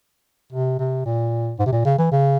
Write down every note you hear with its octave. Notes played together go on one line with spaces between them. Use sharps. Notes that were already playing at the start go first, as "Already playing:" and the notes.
C3
C3
A#2
G#2
C3
A#2
C#3
E3
C#3